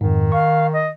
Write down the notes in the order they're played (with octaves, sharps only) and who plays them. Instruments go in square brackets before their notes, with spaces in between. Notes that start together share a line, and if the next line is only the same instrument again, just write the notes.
[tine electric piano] F2 G#2 [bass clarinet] D#3
[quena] F5 [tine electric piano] C#6
[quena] D#5